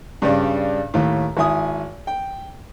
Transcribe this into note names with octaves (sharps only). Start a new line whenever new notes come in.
G2 C#3 G3 D4
D#2 A2
G#1 E4 G#5 D#6
G5